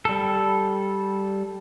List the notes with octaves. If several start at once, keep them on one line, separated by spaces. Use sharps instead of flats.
G3 A4